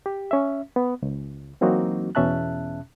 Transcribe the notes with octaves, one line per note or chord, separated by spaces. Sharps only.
G4
C#4 E5
B3
C#2
E3 F#3 A#3 C4 D#4 F#4
E2 B2 C#4 E5 A5 F#6